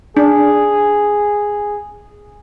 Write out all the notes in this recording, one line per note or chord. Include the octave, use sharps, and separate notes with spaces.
D4 G#4